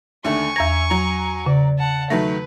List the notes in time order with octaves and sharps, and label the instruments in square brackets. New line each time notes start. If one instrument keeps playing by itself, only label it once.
[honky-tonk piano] D#2 D3 A3 [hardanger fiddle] G#5 C#6
[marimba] E2 A#6 [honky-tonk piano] E5 A#5 G#6
[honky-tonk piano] F#3 A#5
[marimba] C#3 [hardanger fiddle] D5
[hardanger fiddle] F#5 A5
[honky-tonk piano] D#3 F#3 A3 [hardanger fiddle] B4 [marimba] A#6